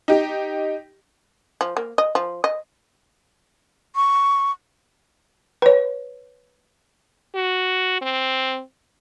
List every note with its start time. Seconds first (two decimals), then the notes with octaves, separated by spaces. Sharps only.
0.08 D#4 G4
1.61 F3
1.77 A#3
1.98 D#5
2.15 F3
2.44 D#5
3.96 C#6
5.62 B4 C#5
7.35 F#4
8.02 C4